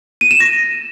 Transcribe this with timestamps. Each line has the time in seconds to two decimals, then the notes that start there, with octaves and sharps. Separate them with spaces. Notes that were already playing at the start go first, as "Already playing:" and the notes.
0.21 D#7
0.31 E7
0.40 A#6